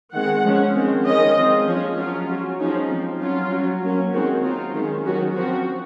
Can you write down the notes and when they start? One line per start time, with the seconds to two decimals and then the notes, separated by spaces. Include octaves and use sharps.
0.14 D#3 G#3 C4 F#5
0.45 F3 G#3 C#4
0.75 D#3 G#3 C4
1.06 D#3 G#3 C#4 D#5
1.37 F3 G#3 C4
1.68 F3 G#3 C#4
1.98 F#3 C#4 F4
2.29 F#3 C#4
2.60 F3 G#3 C#4 D#4
2.90 F3 C4
3.21 F#3 C#4 F4
3.52 F#3 C#4
3.83 F#3 A#3 C#4
4.13 D#3 G#3 C4 F#4
4.44 F#3 C4 F4
4.74 D#3 G#3 C#4
5.06 D#3 F#3 C#4 F#4
5.36 F3 C4 F#4